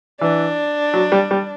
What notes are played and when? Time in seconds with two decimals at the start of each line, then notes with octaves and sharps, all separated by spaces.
0.21 E3 D4
0.94 F#3
1.12 G3
1.31 G3